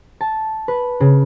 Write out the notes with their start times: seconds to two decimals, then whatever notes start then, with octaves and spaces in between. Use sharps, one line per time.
0.21 A5
0.68 B4
1.00 C#3